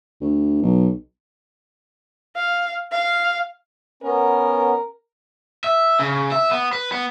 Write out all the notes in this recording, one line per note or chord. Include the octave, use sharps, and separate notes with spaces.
D2
B1
F5
F5
B3 C#4 A#4
E5
C#3
E5
B3
B4
B3